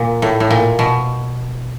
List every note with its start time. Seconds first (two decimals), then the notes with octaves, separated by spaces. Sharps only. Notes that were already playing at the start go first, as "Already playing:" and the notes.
Already playing: A#2
0.22 A2
0.40 A2
0.51 A#2
0.79 B2